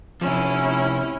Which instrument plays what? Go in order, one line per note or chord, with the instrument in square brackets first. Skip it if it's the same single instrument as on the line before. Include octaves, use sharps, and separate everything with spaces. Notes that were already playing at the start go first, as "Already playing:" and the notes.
[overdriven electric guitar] C3 F3 [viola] C#4 E4